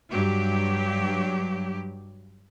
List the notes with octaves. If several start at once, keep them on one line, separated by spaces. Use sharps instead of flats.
G2 F#3 G4